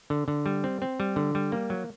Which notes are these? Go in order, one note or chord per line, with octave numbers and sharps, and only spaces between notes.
D3
D3
G3
C4
C4
G3
D3
G3
A#3
F#3